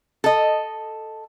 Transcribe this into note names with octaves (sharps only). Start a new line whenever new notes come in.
A4 D#5